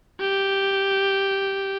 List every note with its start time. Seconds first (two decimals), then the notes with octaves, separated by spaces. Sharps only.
0.20 G4